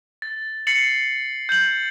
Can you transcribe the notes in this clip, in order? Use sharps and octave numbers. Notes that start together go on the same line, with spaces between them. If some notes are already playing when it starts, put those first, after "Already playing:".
A6
A6 C7 C#7 F#7
G6 F#7